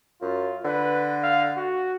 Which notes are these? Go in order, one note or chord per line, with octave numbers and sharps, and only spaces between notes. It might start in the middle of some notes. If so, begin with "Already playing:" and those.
F#2 F4
D3 B4
F5
F#4